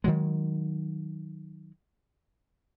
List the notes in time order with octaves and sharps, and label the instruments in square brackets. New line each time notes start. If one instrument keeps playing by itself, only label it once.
[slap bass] D#3 F#3 G#3